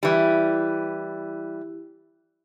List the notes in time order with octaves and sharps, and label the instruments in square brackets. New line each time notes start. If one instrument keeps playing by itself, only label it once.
[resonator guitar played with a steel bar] E3 G3 [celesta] E4 G4